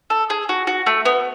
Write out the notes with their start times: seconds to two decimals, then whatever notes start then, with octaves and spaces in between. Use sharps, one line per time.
0.10 A4
0.30 G#4
0.49 F#4
0.67 F#4
0.86 A3
1.05 B3